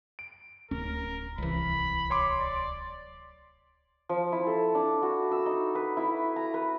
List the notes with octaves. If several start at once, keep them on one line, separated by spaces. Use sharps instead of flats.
D7
D1 F#3 C#4 A#4
C2 E3 B5
C#5 C6 D6
D5
F3
E4
A4
D4
F#4
E6
D#4
B4
E4
A#5
B4